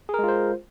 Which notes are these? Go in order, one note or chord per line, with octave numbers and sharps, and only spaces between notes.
G#3 F4 G#4 A#4 C5